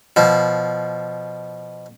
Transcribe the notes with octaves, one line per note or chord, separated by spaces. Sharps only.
B2 F3